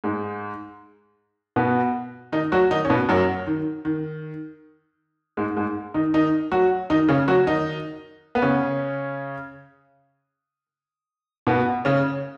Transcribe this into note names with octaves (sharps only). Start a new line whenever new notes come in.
G#2 G#3
B2 B3
D#3 D#4
F#3 F#4
D#3 D#4
C#4
B2 B3
F#2 F#3
D#3
D#3
G#2 G#3
G#2 G#3
D#3 D#4
D#3 D#4
F#3 F#4
D#3 D#4
C#3 C#4
F#3 F#4
D#3 D#4
B3
C#3 C#4
B2 B3
C#3 C#4